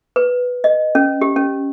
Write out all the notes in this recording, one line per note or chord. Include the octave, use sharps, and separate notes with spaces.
B4
D#5
C#4
G4
C#4